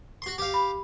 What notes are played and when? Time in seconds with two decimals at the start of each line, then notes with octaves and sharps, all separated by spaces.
0.22 F#4 C6
0.38 G4 F5
0.54 B5